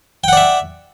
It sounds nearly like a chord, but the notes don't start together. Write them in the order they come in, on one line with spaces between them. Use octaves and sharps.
G5 F#5 D5 E5